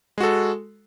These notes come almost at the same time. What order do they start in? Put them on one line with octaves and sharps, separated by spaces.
G#3 F#4 A4